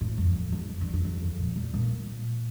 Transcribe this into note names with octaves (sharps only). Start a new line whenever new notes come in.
A2
F2
F2
E2
F2
G2
F2
E2
F2
A#2
G3
A#2